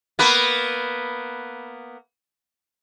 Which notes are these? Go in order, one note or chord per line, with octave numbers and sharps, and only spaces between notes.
A#3 B3 B4